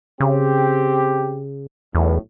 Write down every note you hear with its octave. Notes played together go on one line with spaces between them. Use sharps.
C#3 C4 G4
B1 E2 A2